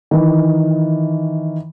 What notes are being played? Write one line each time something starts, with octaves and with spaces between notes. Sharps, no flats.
D#3 E3